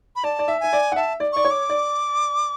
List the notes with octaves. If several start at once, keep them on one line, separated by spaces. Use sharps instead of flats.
B5
D5 A5
D5
E5
E5 G#5
D5
F#5
E5 A5
D5
D5 C#6
C#5
D6
D5